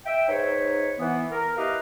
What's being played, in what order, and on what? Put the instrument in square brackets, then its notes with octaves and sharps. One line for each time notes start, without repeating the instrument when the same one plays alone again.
[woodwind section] E5 G5
G#2 D#4 B4 C#5
E3 B3
A#4
E4 G4 A#4 B4 D#5 F5